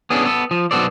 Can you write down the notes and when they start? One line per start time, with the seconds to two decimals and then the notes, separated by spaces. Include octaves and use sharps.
0.10 B3 C#4 D4 E4 G#4 A4
0.25 B3 A4
0.51 F3
0.71 B1 B3 F#4 A4 C5 D5